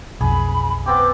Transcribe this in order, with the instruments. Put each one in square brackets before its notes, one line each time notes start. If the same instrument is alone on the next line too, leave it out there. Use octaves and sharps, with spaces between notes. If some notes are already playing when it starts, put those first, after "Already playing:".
[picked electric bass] B1 F2 [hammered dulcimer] G#4 [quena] B5
[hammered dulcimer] B3 C4 G4 [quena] D6